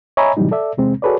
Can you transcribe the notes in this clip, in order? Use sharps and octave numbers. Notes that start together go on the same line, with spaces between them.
C#5 D#5 E5 G#5 A#5 B5
A2 C3 E3 F#3 G3 D#4
A4 D5 E5
E2 C3 G#3 C4
F#4 G#4 A4 B4 C#5 D5